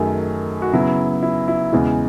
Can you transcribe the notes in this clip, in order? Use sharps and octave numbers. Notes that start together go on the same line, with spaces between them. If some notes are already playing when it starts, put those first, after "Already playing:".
Already playing: F#2 D#3 A3 G#4
F#4
C#3 F#3 B3 E4
E4
E4
E2 C#3 E3 G#3